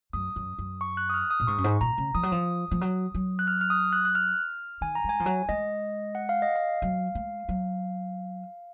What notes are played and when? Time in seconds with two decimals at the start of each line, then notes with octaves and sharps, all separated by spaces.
0.13 F#2 D#6
0.36 F#2
0.58 F#2
0.81 C#6
0.97 F#6
1.10 D#6
1.14 F6
1.31 D#6
1.40 A#2
1.47 G#2 C#6
1.58 F#2
1.64 G#2
1.81 A#2 A#5
1.98 C#3
2.14 F3 D#6
2.23 F#3
2.32 F3
2.71 F3
2.81 F#3
3.14 F#3
3.39 F#6
3.47 F6
3.61 F6
3.70 D#6
3.93 F#6
4.05 F#6
4.15 F6
4.81 D#3 G#5
4.95 A#5
5.04 G#3
5.09 G#5
5.20 F3
5.26 F#3
5.49 G#3 D#5
6.15 F#5
6.29 F5
6.42 D#5
6.56 F5
6.82 F#3
7.15 G#3
7.49 F#3